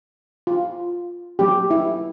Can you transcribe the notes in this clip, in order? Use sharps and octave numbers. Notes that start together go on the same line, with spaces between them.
F4
F#3 A#3 C#4 G4
E4